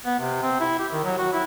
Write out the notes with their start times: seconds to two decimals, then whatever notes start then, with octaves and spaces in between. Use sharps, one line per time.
0.05 B3
0.20 C3
0.43 C4
0.61 E4
0.79 G4
0.92 D#3
1.04 F#3
1.18 F#4
1.33 E4